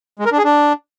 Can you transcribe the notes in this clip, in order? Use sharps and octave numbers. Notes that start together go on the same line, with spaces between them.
G#3
A#4
D4
G#4
D4